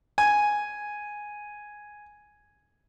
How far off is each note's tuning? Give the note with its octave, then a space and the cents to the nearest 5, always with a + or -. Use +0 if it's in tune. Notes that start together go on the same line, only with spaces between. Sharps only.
G#5 +0